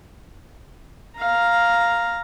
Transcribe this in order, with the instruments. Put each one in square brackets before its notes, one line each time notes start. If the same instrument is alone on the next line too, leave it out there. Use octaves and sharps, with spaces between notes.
[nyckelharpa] F5 A#5